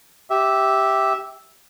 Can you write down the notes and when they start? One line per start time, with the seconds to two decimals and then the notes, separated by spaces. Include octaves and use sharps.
0.30 G4 E5